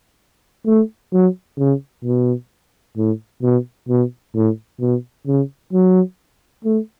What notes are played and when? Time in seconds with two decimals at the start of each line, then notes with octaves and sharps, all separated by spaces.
0.67 A3
1.13 F#3
1.59 C#3
2.05 B2
2.97 A2
3.43 B2
3.89 B2
4.35 A2
4.81 B2
5.27 C#3
5.73 F#3
6.65 A3